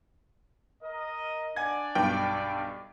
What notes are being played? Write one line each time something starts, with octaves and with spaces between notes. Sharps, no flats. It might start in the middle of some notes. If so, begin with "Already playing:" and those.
A#4 D#5
D4 D5 F#5 G#5 G#6
B1 G2 G5